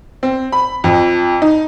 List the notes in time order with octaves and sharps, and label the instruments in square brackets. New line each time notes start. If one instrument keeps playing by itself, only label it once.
[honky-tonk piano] C4
B5
F2
D#4